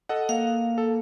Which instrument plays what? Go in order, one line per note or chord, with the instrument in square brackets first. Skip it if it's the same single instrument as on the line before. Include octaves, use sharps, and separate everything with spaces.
[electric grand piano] A4 D#5 F#5
[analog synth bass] A#3 [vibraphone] F5
[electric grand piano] A4